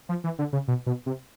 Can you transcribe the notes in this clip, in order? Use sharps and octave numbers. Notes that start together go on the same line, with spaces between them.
F3
E3
D3
C#3
B2
B2
C3